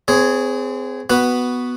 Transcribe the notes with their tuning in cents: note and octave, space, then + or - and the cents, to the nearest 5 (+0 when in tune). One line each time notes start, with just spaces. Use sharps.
C4 -35 G#4 +0 C#5 +0
B3 +0 F#4 +0 B4 +0